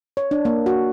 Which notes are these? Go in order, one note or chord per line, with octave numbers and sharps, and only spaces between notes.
C#5
D4
A#3
F#4